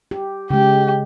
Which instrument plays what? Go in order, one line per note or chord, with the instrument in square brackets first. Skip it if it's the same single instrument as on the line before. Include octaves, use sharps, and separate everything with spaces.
[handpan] G4
[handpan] C#3 G#3 [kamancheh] G4